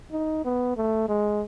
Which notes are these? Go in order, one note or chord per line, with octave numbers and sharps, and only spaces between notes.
D#4
B3
A3
G#3